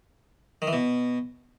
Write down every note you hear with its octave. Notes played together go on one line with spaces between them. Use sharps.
D#3
E3
B2